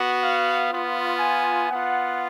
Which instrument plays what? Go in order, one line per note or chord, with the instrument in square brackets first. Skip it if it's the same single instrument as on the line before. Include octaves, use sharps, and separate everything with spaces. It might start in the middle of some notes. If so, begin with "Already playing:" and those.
Already playing: [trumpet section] B3 F#4
F5
B3 F4
G#5
B3 F4 F#5